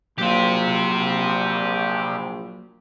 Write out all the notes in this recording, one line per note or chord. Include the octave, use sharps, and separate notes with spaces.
A#1 F#3 A#3 F4 G4 C5